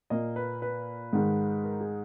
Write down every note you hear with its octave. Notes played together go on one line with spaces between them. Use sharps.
A#2 A#3 D#5
B4
B4
G#2 D#3 G#3
A#4
G#4